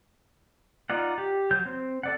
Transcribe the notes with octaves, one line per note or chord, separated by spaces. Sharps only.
D#4 F4 D5 F#5
G4
F#3 G6
C4
A4 D5 F#5